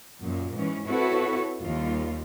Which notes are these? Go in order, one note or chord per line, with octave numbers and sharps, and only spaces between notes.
F#2 A#2
G#2 E3 C#4
C4 E4 F#4 A4 B4 C#5
D#2 G3 F4